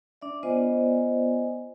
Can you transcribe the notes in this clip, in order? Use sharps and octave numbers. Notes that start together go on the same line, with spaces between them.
D4 D5 E5
B3 F4 C5 D5 D#5 G#5